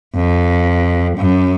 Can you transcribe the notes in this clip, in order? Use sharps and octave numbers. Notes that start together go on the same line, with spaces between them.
F2
F#2